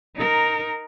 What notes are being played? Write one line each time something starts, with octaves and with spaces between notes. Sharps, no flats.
D#4 A#4